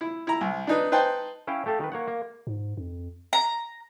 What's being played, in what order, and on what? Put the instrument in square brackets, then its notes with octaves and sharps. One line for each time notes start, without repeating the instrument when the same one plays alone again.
[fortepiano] E4
E4 A#5
C2
D4 D#4 B4
D#4 B4 C5 G5 A5
[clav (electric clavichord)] C#4 E4 F5 G5
A3 G4 A4 F5
D#3 B4
A#3 C#5 F#5
A#3
[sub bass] G#2
F2
[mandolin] A#5